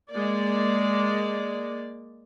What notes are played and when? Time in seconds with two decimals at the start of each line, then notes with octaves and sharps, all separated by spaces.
0.12 G#3 A#3 D5